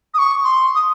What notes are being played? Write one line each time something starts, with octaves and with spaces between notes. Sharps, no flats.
D#6
C#6
C6
D#6